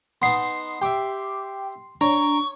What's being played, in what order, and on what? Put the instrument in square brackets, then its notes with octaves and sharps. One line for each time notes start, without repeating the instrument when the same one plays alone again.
[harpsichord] B3 D#4 A5 [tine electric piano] C6 C7
[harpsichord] G4 E5 [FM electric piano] G5 D6
[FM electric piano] D4 [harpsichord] C#5 [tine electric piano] A#5 [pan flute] C#6